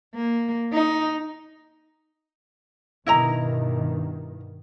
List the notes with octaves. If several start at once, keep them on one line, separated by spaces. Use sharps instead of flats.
A#3
D#4
G2 B2 D#3 E4 D#5 A#5